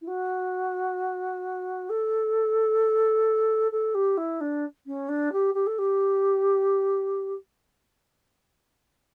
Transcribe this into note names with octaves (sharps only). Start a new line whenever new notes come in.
E4
F#4
A4
A4
G4
E4
D4
C#4
D4
G4
G4
A4
G4